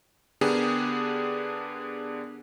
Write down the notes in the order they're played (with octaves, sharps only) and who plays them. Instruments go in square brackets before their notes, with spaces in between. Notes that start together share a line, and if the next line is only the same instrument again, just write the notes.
[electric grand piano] D3 B3 D4 G4 G#4 A#4